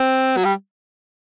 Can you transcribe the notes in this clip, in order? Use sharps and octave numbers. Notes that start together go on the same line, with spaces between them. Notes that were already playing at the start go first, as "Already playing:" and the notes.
Already playing: C4
F#3
G3